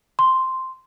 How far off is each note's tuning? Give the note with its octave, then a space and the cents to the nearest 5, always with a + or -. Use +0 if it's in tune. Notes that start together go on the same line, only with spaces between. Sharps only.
C6 -5